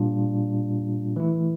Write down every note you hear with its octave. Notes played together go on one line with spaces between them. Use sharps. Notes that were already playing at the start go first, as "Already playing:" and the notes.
Already playing: A#2 G3 D4 F4
E3 A3 E4